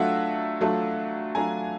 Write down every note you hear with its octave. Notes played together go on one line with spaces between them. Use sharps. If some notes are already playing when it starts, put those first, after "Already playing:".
Already playing: F#3 A3 D4 F4 E5 F#5
F#3 A3 D4 F4
F#3 A3 D4 F4 G#5 A#5